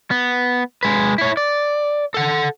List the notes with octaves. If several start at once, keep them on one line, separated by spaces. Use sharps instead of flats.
B3
G#3 B4
E4 C#5
D5
A4 F#5